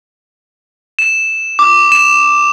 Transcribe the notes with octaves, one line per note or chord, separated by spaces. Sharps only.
E7
D6
E7